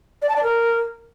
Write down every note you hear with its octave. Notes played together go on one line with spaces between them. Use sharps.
D5
A5
D5
A#4